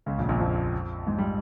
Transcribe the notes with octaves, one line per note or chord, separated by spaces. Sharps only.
C#2 C#3
A#1 A#2
A#1 A#2
F2 F3
G#2
G3